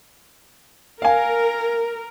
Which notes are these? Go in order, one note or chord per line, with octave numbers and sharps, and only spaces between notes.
A#4 F5 G#5